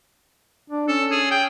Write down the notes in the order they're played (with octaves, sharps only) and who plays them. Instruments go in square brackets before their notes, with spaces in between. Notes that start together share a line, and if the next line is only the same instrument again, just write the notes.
[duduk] D4
[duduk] C#4 [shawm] A4
[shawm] G#4
G5